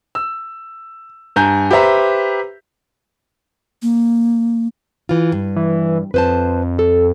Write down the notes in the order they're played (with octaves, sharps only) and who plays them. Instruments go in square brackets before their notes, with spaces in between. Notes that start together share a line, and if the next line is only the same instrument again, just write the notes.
[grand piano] E6
G2 G#5 A#5 G6
G4 B4 C5 E5 A#5
[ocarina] A#3
[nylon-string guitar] E3 F4
G2
[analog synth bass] E3
[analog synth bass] F2 [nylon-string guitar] B4 C5 A5
[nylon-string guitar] A4